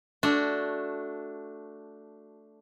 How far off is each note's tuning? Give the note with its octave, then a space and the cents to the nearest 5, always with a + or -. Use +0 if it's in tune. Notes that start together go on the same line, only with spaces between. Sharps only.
A3 +0 D4 -10 F#4 +0